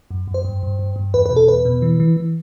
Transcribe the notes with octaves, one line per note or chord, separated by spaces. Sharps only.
F#2
F#2
C5
G2
G2
G2
G2
E2 B4
B4
B2
A4
E2 B4
B2
E3
E3
E3